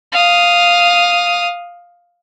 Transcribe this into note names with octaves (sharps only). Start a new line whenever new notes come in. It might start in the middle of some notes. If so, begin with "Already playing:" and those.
F5 D#6